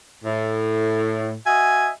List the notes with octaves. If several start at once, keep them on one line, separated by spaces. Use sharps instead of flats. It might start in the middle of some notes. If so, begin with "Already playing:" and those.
A2
F#4 D#5 E5 G#5